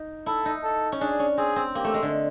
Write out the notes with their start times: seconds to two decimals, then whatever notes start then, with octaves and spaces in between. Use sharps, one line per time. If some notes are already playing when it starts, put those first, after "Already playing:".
Already playing: D#4
0.26 E4 A4
0.45 D#4
0.64 A4
0.92 C#4
1.01 D4 G#4
1.19 C#4
1.37 C4 G#4
1.56 C4
1.75 A#3 G4
1.84 A3
1.94 G#3
2.03 D3